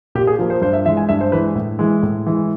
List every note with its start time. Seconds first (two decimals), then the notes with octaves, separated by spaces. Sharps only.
0.15 A#2 G4
0.27 G#4
0.39 F3 A#3
0.50 C5
0.62 G2 C5
0.73 E5
0.86 E3 G#3 E5
0.97 G#5
1.09 G2 E5
1.21 C5
1.32 E3 G#3 B4
1.55 A2
1.79 E3 G#3
2.03 A2
2.26 E3 G#3